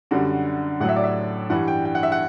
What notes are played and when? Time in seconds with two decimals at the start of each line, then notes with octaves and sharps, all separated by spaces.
0.11 F#2 D3 G3 F#4
0.80 A2 F#3 F#5
0.89 E5
0.96 D5
1.04 E5
1.50 G2 E3 G3 F#5
1.68 G5
1.85 G5
1.95 F#5
2.03 E5
2.12 F#5